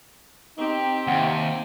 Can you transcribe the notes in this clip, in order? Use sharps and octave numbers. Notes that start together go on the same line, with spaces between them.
C4 D#4 G4
D#2 C3 F#5